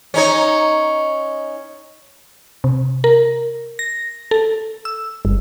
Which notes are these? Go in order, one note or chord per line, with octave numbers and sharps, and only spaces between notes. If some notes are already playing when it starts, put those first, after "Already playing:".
C#4 D#4 C#5
C3
A#4
A#6
A4
E6
G1